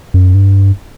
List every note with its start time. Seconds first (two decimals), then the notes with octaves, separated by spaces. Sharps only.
0.14 F#2
0.35 G2